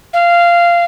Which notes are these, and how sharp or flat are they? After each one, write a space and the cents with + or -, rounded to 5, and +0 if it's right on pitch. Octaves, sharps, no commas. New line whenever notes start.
F5 -15